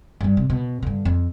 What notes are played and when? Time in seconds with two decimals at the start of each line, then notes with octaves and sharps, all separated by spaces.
0.21 G2 G3
0.37 C3
0.50 B2
0.83 G2 D3
1.05 F2